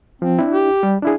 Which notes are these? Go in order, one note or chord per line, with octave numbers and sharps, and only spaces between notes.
F3 C4
D4 E4
G4
G3
D4 E4 G#4